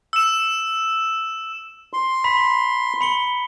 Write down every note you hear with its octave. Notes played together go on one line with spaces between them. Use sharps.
E6 E7
C6
A#5 B5 B6
B5 C#7 G7